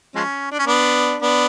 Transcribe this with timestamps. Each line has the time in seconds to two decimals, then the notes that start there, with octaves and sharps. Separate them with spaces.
0.16 F3 G#3 C#4
0.52 D4
0.59 C#4
0.67 B3 D4
1.22 B3 D4